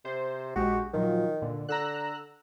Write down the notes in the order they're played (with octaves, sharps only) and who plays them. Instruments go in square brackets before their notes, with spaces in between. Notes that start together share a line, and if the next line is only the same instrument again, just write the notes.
[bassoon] C3 [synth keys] C5
[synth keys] A#1 G#3 G4 [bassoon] F#4
[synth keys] A#2 F3 F#3 [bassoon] D#3
[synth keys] A#2 D3
[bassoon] D3 [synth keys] A#5 E6 F#6